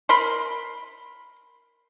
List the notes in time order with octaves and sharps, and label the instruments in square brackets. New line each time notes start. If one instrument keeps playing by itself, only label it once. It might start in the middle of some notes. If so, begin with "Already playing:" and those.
[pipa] A#4 B5 C6